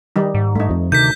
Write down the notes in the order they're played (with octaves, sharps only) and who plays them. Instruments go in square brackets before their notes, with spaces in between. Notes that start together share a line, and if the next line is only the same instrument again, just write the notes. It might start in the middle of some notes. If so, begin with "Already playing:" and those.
[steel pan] D#3 G3 D#4
[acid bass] G#2
[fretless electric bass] G2 [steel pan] A3 D#4
[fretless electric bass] F2 F3
[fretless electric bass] D2 D#3 [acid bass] C3 [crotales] G6 B6